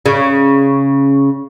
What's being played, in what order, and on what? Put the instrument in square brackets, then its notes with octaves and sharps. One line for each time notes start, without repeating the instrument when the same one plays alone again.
[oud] C#3